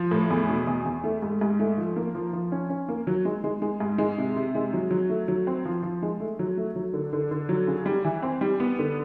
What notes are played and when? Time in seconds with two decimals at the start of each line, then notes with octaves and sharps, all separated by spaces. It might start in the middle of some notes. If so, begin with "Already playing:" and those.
Already playing: F3
0.11 A2
0.30 E2
0.49 B2
0.67 E2
0.85 E2
1.04 A3
1.22 G#2
1.41 G#2
1.59 A3
1.77 F3
1.96 A#3
2.15 F3
2.33 F3
2.52 C#4
2.70 C#4
2.88 A#3
3.07 F#3
3.25 G#3
3.44 G#3
3.62 G#3
3.80 G#2
3.98 G#3
4.18 C3
4.36 C3
4.55 G#3
4.73 F#3
4.91 F#3
5.10 A3
5.28 F#3
5.47 C4
5.65 F3
5.83 F3
6.02 G#3
6.20 A3
6.39 F#3
6.57 A3
6.76 F#3
6.93 D3
7.13 D3
7.31 D3
7.49 F#3
7.67 C#3
7.86 G3
8.04 E3
8.22 C4
8.41 G3
8.60 B3
8.79 D3